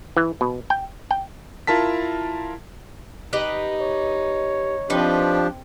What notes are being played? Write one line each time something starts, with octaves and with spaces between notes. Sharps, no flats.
E3
B2
G5
G5
E4 F4 A#4 A5 B6
D#4 G4 B4 D#5
C#5
F3 C4 D4 D#4 G4 B4 G5